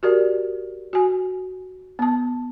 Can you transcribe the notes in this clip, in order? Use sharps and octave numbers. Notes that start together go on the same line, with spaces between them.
F#4 G4 A#4 D5
F#4 G#5
B3 A5